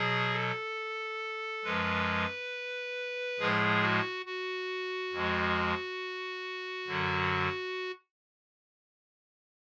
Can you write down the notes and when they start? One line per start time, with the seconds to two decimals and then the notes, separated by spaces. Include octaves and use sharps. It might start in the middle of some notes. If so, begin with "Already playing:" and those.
Already playing: B2 F#3 G#4
0.33 A4
1.64 F#2 F3 G#3 B4
3.39 A2 F3 G#3 G#4
3.82 F#4
4.26 F#4
5.13 F2 F3 G#3
6.88 F#2 D3 F#3